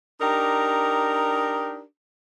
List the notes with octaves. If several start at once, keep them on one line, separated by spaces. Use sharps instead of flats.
D4 D#4 G4 A#4